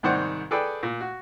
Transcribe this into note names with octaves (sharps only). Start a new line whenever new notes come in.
C2 G#2 D#3 C5 D5 F#5
G#4 A4 B4 D5 G5
A#2
F#4